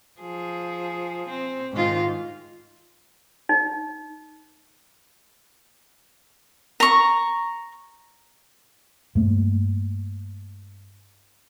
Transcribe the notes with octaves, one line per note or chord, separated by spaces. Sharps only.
F3 G#4
C4
G#2 D#3 F4
D#4
A#5 C#6
G2 A3 A#3